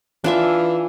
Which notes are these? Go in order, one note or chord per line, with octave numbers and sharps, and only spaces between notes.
E3 D4 F4 E5